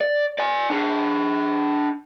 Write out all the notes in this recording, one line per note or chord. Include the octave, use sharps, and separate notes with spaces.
D5
D5 G#5
D4 G#4